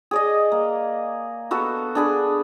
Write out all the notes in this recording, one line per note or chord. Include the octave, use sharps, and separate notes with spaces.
G#4 D5 D#5
A#3
B3 F#4 A4
D4 G#4 B5